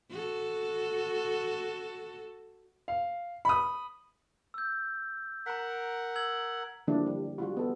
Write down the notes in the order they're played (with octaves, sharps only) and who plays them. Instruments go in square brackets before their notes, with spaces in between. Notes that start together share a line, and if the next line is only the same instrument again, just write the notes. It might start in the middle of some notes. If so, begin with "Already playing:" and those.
[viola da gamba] F#4 A4
[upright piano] F5
B5 D#6
[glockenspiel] E6 G6
[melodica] A#4 F#5 [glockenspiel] A#5 B6
[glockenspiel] E6 G#6 F#7
[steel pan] D3 F3 G3 A#3 D4 E4
G3
G3 F4 F#4
B3 A4